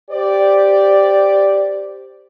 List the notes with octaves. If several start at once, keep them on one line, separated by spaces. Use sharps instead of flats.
G4 C5 D5